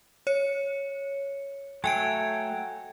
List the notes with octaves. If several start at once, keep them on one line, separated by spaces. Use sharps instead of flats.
C#5 C#7
F#3 A3 C#5 G5 G#5 D7